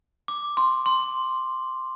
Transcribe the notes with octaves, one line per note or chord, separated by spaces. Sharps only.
D6
C6
C6